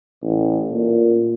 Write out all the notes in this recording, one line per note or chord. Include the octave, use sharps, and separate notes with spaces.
A1
A#2